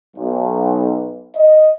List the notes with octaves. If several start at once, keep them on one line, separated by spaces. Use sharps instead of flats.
B1
D#5